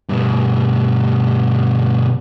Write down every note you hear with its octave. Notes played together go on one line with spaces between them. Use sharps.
G2 B2